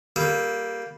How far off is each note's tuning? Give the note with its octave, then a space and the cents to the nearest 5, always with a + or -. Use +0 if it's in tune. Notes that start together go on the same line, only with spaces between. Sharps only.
G3 +0 A#3 +0 A4 -45